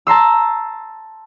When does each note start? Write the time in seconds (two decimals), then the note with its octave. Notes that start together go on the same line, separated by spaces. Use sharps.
0.07 A5 A#5 C6 E6